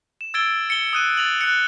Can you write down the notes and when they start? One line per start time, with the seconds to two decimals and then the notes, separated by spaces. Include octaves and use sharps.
0.21 E7
0.34 E6 G#6 A6 D7 G7
0.70 C#7 G7
0.93 D#6 F#6 D#7
1.17 A6 F7 F#7
1.41 F#6 C#7